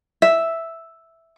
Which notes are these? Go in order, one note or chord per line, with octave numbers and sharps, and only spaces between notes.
E5